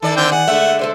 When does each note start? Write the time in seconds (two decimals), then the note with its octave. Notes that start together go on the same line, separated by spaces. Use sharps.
0.02 D#3 A4 D5
0.17 D3 C4 G5
0.32 G#4 F#5
0.47 D3 G#3 A3 E5
0.79 A4 C5 D5